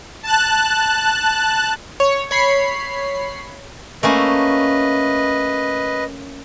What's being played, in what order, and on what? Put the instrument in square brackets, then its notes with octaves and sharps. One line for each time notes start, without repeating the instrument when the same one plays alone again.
[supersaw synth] A5 F#6
[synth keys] C#5
C#5 B5 C7
[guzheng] A3 A#3 C#4 [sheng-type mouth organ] B4 D#5